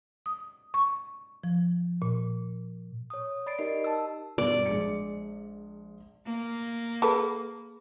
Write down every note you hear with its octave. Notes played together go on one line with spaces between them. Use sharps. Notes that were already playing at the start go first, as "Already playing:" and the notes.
D#6
C#6
F3
A#2
C#5 D#6
D5 B5 A6 C7 D7
D#4 G4 A#4 D#5 C7
A5 E6
G2 B2 D5
A#1 G#3 C#7
A#3
G#4 A4 B4